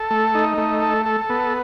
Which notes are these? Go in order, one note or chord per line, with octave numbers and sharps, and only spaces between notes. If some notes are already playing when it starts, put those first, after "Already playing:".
Already playing: A4
A3
D#4
A3
A4
A4
B3